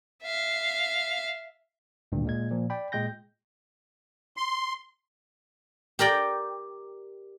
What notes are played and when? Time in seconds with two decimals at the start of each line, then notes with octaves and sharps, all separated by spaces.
0.24 E5 F5
2.12 G#1 D2 G2 A#2
2.25 A#2 G#3 G#6
2.51 A#2 F3
2.70 D5 G5 B5
2.92 A#2 G#3 G5 G6 A#6
4.37 C6
5.99 G4 A#4 D5 G5